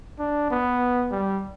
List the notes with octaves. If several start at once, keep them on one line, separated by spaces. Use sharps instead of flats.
D4
B3
G3